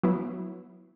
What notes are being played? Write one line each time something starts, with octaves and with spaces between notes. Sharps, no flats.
F#3 B3 E4